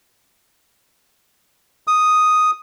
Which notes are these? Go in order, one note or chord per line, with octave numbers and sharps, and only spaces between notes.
D#6